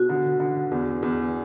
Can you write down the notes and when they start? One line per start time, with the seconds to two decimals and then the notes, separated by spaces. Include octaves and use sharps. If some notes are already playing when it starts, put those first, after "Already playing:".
Already playing: B2 F#4
0.09 D3
0.40 D3
0.71 E2
1.02 E2